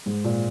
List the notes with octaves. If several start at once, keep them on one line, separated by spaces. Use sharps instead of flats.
G#2
A#2